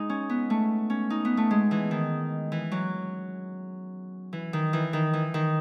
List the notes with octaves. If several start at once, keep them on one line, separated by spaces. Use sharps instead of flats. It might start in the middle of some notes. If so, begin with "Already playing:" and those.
Already playing: G#3 D#4
C#4
B3
A3
C#4
D#4
B3
A3
G#3
E3
D#3
E3
F#3
E3
D#3
E3
D#3
E3
D#3